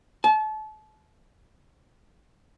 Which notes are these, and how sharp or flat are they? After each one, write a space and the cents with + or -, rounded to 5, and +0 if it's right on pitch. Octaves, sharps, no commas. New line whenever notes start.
A5 -35